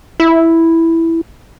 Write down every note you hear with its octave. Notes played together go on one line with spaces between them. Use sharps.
E4